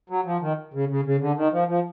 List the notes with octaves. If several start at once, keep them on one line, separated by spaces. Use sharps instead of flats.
F#3
F3
D#3
C#3
C#3
C#3
D3
D#3
F3
F3